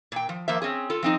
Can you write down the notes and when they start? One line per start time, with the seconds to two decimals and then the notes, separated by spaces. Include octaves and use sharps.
0.12 A#2 G5
0.29 F3
0.48 F3 A#3 C5 E5
0.62 C4 C#4 G#4
0.90 F4 A4
1.03 F3 C4 D#4